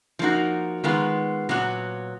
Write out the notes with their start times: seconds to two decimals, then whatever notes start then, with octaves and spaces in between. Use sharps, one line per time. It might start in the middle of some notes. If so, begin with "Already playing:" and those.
0.19 F3 A#3 D#4 F#4
0.84 D#3 G#3 B3 F4
1.49 A#2 F#3 B3 F#4